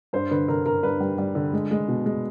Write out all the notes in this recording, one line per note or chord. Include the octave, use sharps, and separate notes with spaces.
G2 C5
D3 B4
D3 A#4
D3 A#4
G2 B4
G3
G3
D3
G#3
G#3
B2
G#3